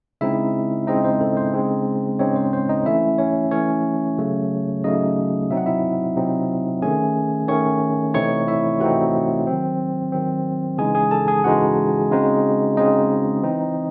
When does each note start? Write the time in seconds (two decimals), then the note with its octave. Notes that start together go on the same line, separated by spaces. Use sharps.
0.21 C#3 G#3 C4 D#4 E4 E5
0.87 C#3 G#3 C4 D#4 D#5
1.04 C5
1.20 A4
1.37 C5
1.54 C#3 G#3 C4 D#4
2.19 C#3 G#3 C4 C#4 D#4 C#5
2.36 C5
2.53 C5
2.69 D#4 D#5
2.85 E3 A3 C#4 E4 E5
3.18 C#4 C#5
3.51 E3 A3 C#4 C#5
4.18 C#3 F#3 A3
4.84 C#3 F#3 A3 D#4 D#5
5.50 C3 F#3 C4 D#4 E5
5.57 F#5
5.66 E4 E5
6.16 C3 F#3 C4 D#4
6.82 D#3 A3 C#4 G#4 G#5
7.48 D#3 A3 C#4 C#5 C#6
8.14 C3 E3 A3 C4 D#4 C#5 C#6
8.47 E4 E5
8.80 C3 E3 A3 C4 D#4 F#4 F#5
9.47 D#3 F#3 C4
10.12 D#3 F#3 C4
10.78 C#3 E3 G#3 D#4 G#4 G#5
10.95 G#4 G#5
11.11 A4 A5
11.28 G#4 G#5
11.44 C#3 E3 G#3 D#4 F#4 F#5
12.11 C#3 G#3 C4 D#4
12.77 C#3 G#3 C4 D#4 D#5
13.43 E3 C4 D#4